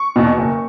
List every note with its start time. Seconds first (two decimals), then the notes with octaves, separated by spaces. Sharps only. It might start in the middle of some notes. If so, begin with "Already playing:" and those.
Already playing: C#6
0.16 E2 B2
0.38 F#1